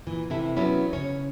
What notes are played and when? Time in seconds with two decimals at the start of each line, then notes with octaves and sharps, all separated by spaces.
0.07 A#2 E3
0.30 C3 E3 E4 A4
0.56 F#3 B3 C#4 E4
0.93 C#3 C#4 C#5